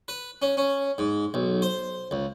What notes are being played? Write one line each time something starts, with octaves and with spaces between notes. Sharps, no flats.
B4
C#4
C#4
G#2
B1
C5
C#2